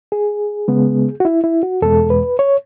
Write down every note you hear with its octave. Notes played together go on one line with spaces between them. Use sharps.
G#4
C#3 G#3 B3
F#4
E4
E4
F#4
E2 B2 G#3 A4
B4
C#5